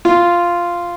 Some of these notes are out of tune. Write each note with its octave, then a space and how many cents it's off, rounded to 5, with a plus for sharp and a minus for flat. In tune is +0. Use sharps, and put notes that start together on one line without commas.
F4 -5